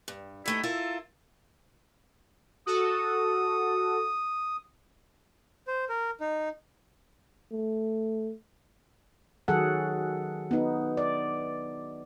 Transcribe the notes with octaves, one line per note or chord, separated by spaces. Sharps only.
G2
D#3 A3 D#4 E4
E4 F4 A4 A#4
F#4 A4 D#6
C5
A#4
D#4
A3
D#3 F#3 G#4 A4 F#5
B3 D#4
D5